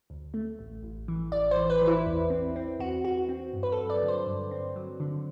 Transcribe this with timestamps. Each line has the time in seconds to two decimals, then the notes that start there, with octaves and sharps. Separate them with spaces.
0.10 D2
0.34 A3
0.59 A1
0.83 A1
1.08 E3
1.32 A1 D5
1.51 C5
1.56 E3
1.70 B4
1.81 E3
1.87 E4
2.06 E2
2.30 C4
2.56 C4
2.79 E2 F#4
3.04 E2 F#4
3.29 C4
3.53 G2
3.63 B4
3.72 A4
3.78 F#3
3.90 D5
4.03 D3
4.08 C5
4.27 G2
4.51 C4
4.76 F#3
5.00 D3